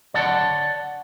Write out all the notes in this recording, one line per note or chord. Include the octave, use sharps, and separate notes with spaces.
C#5 D5 F#5 A5